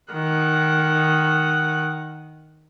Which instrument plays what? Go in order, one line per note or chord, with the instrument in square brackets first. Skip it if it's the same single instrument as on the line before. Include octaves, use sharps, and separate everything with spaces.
[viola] D#3 F#5